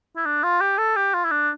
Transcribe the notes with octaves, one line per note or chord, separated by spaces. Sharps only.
E4
D4
F4
G4
A4
G4
F4
E4
D4